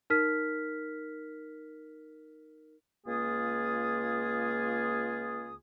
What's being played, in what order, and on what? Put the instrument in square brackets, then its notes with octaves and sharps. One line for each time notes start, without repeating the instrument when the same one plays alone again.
[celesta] D#4 A#4 F6 B6
[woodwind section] C#2 A#3 F4 G#4 D#6